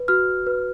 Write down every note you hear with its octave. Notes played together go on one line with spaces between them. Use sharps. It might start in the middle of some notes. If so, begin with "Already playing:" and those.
Already playing: B4
F#4 F6
B4